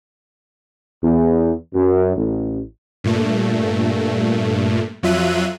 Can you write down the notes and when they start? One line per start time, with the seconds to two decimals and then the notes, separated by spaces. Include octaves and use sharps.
1.03 E2
1.74 F#2
2.16 A1
3.04 G2 A#2 A3
5.03 F2 F#3 F4 E5 F#6 D#7